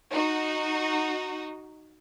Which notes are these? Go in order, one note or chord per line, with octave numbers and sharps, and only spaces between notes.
D#4 F#4